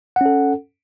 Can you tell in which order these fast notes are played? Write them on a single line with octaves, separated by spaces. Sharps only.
F#5 C#4 A4